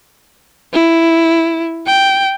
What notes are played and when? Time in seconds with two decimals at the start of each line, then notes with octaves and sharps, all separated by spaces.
0.73 E4
1.87 G5